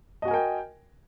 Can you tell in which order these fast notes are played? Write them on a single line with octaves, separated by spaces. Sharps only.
D#5 F#4 G#5 A#4 G5